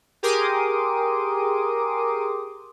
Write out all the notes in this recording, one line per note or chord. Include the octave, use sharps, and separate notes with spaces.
G4 G#4 A#4 C6 D6 D#6